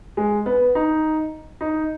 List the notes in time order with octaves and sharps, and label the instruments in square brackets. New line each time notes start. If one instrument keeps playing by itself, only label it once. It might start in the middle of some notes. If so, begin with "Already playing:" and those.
[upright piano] G#3
B3
D#4
D#4